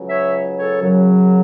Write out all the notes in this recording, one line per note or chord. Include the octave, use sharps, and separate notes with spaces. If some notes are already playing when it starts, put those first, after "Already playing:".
Already playing: C#2 C#3 F#3
C#5 E5
A4 C#5
F#2 C#3 F#3